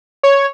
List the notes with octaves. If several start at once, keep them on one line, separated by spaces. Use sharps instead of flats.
C#5